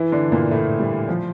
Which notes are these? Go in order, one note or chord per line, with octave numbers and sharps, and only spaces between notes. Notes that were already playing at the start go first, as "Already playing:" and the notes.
Already playing: E3 E4
D3 D4
A#2 A#3
A2 A3
G3
F3